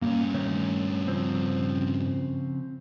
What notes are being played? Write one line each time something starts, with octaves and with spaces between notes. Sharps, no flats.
G2 A#3 C#4
D#3 A3 C#5
C#3 F3 C4